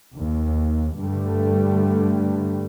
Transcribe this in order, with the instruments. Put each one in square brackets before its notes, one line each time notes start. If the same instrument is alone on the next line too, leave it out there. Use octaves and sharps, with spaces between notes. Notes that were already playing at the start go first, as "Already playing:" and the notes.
[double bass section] D#2
G2 D3 G3 A3